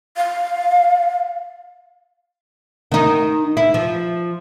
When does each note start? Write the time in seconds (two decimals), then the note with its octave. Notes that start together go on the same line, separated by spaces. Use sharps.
0.17 F5
2.92 D#3 D#4
3.57 E4
3.74 F3